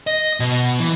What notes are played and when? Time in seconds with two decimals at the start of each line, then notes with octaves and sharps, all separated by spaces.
0.07 D#5
0.40 B2
0.80 E3